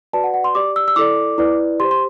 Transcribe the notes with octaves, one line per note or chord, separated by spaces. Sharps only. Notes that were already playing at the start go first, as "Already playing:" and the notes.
F#4 B4 D5 A5
F#5
F#5
C6
G4 D5 D6
E6
E6
E4 A4 D5 D6
E4 B4 D5
G4 C5 C6
C6